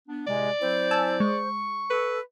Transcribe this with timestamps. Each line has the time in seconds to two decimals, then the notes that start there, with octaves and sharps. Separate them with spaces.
0.08 B3 D4
0.27 A2 C3 G#3 D5
0.61 F#3 C4 E4 C5
0.91 G#5 A5 E6
1.20 G#3 C#6
1.90 A4 B4